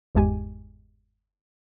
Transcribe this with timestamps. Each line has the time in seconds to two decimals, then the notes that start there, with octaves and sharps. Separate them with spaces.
0.15 G1 E2 G#2 G#3 G4 G#5